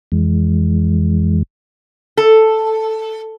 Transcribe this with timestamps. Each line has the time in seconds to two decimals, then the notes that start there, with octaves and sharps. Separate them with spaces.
0.12 F2 E3 G#3
2.17 A4